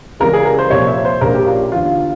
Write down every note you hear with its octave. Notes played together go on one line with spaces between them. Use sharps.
C#2 C#3 E3 G3 A#4
G#4
A#4
C5
C2 A#2 F3 A#3 C#5
E5
C5
A#1 A#2 G3 C#4 A#4
G4
F4
G1 G2 E3 F4